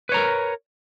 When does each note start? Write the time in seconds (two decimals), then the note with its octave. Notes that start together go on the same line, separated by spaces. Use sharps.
0.09 B4
0.12 C#5
0.14 A#5
0.17 A#4